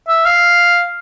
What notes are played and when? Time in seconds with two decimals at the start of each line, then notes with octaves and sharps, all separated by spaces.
0.09 E5
0.26 F5